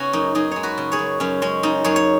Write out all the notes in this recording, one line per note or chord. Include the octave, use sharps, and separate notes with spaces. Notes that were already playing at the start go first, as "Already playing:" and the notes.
Already playing: C#3 B3 C#4 F#4
F#2 D#4
F#2 D#4 G#4
G#3 C#5
F#4 B4
C#3
G#4 C#5
F#2
F#2 C#4
G#3 C#4
C#3 D#4
F#2 G#4 C#5
C#5